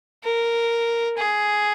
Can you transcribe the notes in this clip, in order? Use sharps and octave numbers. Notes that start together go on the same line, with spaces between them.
A#4
G#4